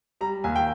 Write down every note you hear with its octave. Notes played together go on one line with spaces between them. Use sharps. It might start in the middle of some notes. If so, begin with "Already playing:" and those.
G3 A#5
D#2 G#5
G5